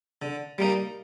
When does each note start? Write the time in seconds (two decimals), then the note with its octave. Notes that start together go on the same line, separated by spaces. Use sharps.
0.22 D3
0.58 G3 A#3 D#4